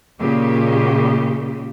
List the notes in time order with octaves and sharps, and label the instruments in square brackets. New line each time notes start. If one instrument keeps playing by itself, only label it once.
[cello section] A#2 C#3 G#3 G4